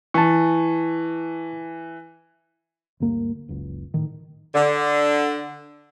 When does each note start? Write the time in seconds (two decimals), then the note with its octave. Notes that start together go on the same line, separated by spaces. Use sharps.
0.14 E3 A5 C#6
3.00 D2 G2 A#3
3.49 F#1 C#2
3.94 A2 D#3
4.54 D3